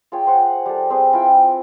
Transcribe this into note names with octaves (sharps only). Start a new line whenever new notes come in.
F4 G#4 C#5 G5
C5 F#5
G3 A4
C4 G#4 B4
E4 F4 G5